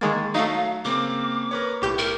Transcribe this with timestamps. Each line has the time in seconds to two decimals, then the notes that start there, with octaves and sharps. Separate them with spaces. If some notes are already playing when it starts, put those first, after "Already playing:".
0.01 D#3 G#3 A#3 C#6 A6
0.35 F#3 A3 D#4 F5
0.85 C#3 A#3 C4 D6
1.51 A#4 B4 C#5
1.82 B1 A2 G4 G6
1.98 A#4